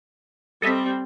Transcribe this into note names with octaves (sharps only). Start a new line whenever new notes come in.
G3 C4 A4 D#5 E5